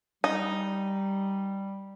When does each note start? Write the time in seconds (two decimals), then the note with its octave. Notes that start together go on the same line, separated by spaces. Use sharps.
0.24 G3 D#4